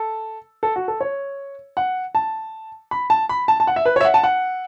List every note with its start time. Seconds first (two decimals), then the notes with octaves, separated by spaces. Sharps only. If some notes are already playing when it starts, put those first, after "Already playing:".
Already playing: A4
0.63 A4
0.76 F#4
0.88 A4
1.01 C#5
1.77 F#5
2.15 A5
2.91 B5
3.10 A5
3.29 B5
3.48 A5
3.60 A5
3.67 F#5
3.76 E5
3.85 B4
3.96 C#5
4.01 E5
4.05 F#5
4.14 A5
4.23 F#5